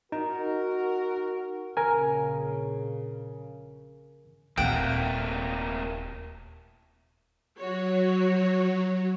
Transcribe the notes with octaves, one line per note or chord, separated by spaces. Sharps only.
D#4 F#4 A#4
A#1 C#3 A#4 G#5
D#1 C3 A3 A#3 C4 F#5 G5
F#3 F#4 C#5